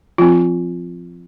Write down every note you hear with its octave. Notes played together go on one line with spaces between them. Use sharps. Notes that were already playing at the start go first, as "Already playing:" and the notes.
F3 C4 F4